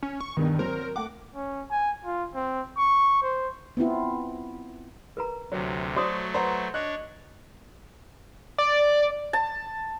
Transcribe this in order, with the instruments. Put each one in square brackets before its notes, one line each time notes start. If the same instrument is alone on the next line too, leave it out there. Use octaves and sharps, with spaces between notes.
[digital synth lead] C#4
C#6
[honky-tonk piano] E2 G2 B2 [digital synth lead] D#3
[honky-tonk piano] F#3 C4 [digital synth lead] A#4
[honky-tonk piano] A3 F#5 [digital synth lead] D6
[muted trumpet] C#4
G#5
F4
C4
C#6
C5
[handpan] B3 C4 E4 F4
[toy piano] A#4 B4 A#5
[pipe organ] D2 C3 [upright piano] F#3
[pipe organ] F#3 A3 [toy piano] F#4 D#6 [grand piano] C5 [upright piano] D5
[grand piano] B4 F#5 A#5 [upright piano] C5
[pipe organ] D4 C#5 [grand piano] D#5 [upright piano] F#6
[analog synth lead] D5
[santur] A5